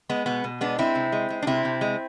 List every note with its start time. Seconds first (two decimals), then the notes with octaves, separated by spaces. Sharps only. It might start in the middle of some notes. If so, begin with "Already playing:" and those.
0.09 G#3 B3
0.26 B2 B3
0.44 B2
0.61 G#3 B3 D4
0.78 G#3 C4 E4
0.95 C3
1.12 G#3
1.30 G#3
1.42 D4
1.47 C3 C4 E4
1.65 C3
1.81 G#3